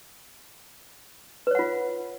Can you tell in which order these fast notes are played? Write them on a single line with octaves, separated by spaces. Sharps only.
B4 C#5 F#5 F4